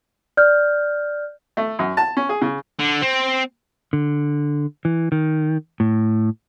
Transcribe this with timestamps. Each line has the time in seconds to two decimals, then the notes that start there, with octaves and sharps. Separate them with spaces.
0.37 D5 F6 G6
1.57 A3
1.79 F#2
1.97 A5
2.17 C#4
2.29 G#4
2.41 C#3
2.79 D3
3.02 C4
3.93 D3
4.85 E3
5.12 D#3
5.80 A2